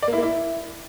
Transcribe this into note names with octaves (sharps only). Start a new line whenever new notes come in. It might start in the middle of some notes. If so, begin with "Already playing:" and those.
D5
A#3
E4
A#3
E4